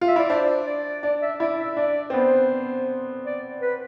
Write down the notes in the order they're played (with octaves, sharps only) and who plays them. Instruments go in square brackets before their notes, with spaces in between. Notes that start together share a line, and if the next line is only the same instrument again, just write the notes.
[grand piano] F4
[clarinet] E5
[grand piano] E4 [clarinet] D5
[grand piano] D4 [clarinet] C5
[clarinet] D5
[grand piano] D4 [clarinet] D5
[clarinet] E5
[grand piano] E4 [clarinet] D5
[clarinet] E5
[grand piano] D4 [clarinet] D5
[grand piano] C4
[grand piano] B3 [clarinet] C5
[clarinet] D5
B4